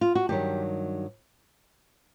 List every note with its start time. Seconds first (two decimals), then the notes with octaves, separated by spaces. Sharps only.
0.01 F4
0.15 F#4
0.29 G2 D#3 F#3 G4